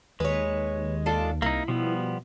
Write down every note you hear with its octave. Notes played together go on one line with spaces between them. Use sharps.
D#2 G#3 B4 C#5
D4 F4 A4
C2 A#3 D#4 E4
B2 F3 G3 B3